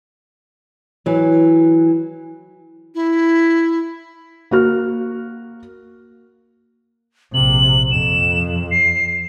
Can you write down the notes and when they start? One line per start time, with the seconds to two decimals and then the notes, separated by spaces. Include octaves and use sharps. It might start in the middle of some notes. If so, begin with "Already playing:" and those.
1.06 E3 F#3
2.94 E4
4.51 A#3 F#4 F6
7.34 A#1 C3 F#7
7.91 F2 E7
8.71 C7